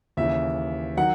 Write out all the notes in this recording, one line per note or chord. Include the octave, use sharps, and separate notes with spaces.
D#2 C#3 E3 E5
D#3 F#3 F#5